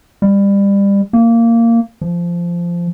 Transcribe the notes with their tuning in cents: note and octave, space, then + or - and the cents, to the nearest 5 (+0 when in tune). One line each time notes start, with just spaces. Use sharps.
G3 +25
A#3 -15
F3 -15